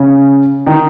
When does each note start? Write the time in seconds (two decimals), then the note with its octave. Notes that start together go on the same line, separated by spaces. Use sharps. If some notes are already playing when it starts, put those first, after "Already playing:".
Already playing: C#3 C#4
0.66 D#3 D#4